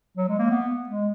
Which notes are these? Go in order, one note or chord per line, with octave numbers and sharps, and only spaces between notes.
F#3
G#3
A#3
B3
G#3